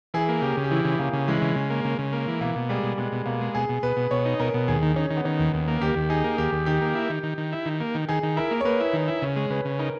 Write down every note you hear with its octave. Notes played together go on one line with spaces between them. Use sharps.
E3 G#4
A#3
C#3 G4
C#3
G4
E3 E4
C#3
C#3 A#3
C#3
E3 G#3
C#3
C#3
A#3
C#3
C#3
A#3
E3
B2 A#3
B2
G3 G#3
B2
B2 G#3
B2
B2 A#3
G#3
B2 G#4
B2
B2 B4
B2
B2 C#5
D#4
B2 A#4
B2
D#2 G#4
D#3
D#3 C#4
D#3
B3
D#3 C#4
D#2
D#2
A#3
D#2 G4
D#2
D#4 G#4
A#3
D#2 G4
D#2
D#3 G4
A#3
E4
D#3
D#3
D#3
E4
D#3
A#3
D#3
D#3 G#4
D#3
E4 A#4
A#3
C#5
A#3 B4
E4
D#3
E4
C#3 C#5
G#3
C#3 B4
C#3
D#4 A#4